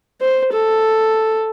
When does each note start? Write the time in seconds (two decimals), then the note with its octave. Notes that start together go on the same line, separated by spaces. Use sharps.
0.21 C5
0.52 A4